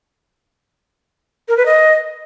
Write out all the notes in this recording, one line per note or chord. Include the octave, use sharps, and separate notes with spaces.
A#4
B4
D#5